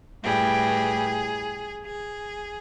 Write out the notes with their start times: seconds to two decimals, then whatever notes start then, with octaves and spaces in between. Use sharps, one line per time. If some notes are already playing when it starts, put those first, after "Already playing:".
0.23 A2 E3 G3 G#4
1.85 G#4